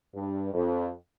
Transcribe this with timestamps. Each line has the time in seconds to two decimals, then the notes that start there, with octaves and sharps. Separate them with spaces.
0.14 G2
0.53 F2